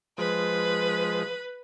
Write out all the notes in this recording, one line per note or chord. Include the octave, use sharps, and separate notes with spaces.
F3 G#3 B4